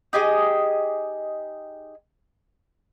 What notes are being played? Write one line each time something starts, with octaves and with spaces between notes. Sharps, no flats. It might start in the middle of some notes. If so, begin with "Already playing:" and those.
D#4 G4 G#4 D#5